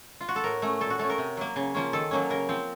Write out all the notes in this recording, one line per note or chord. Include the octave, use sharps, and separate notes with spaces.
F4
F#4
A4
A2 A#4
A3 C#4
A#2 A4
F#4
A3 C#4 A4
A#4
C3
F#3 A#3
C#3
F3 A#3 C#4
D#3 A4
F#3 A#3 C#4
C#3 A#4
F3 C4